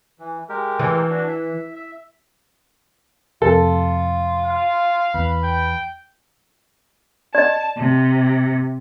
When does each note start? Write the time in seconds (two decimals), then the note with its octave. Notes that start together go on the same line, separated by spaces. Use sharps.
0.19 E3
0.49 G#3 G4 A#4
0.79 E3
1.10 D4 F#4
1.28 E5
1.75 E5
3.42 F2 C3 F4 A4
4.45 F5
5.14 E2 B4
5.44 G5
7.35 D5 D#5 A5
7.76 C3